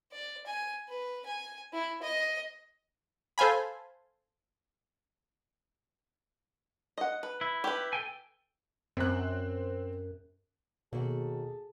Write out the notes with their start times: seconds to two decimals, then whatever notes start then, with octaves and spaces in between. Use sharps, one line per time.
0.12 D5
0.46 G#5
0.88 B4
1.26 G#5
1.73 E4
2.02 D#5
3.38 A4 C5 F5 G#5 B5
6.98 D#5 F#5
7.23 B4
7.41 E4
7.64 G4 B4
7.93 A4 G5 G#5
8.97 F#2 C4 F#6
10.93 D#2 B2 F#4 G#4 A4